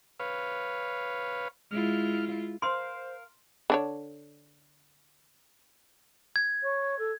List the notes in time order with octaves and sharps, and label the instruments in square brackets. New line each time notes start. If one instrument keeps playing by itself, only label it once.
[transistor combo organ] B4 C#5 F5
[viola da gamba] G#3 E4 F4 [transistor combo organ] F6
[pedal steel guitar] A#4 F5 [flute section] C5 [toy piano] C6
[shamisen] D3 D4 C#5
[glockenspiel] G#6
[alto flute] C#5
A4